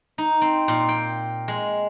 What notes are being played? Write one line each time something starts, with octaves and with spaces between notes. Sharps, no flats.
D#4
C4
A#2
G5
G#3